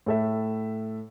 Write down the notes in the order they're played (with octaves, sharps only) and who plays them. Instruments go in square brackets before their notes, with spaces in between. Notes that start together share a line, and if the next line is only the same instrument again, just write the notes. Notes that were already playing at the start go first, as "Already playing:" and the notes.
[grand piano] A2 A4 E5